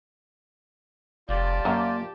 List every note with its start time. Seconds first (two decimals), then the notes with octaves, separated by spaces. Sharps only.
1.29 F1 F4 G4 D5 A5
1.65 F#2 A#3